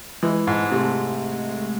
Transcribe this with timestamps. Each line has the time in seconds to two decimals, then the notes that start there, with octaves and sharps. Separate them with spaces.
0.23 E3 G#3
0.47 G#2
0.65 G#3
0.71 C3 A3